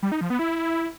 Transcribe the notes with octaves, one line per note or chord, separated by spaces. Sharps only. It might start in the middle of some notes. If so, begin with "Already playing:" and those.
G3
D#4
F3
B3
E4